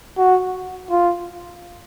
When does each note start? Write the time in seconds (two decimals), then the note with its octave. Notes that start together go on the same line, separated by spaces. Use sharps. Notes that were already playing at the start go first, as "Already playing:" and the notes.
0.17 F#4
0.90 F4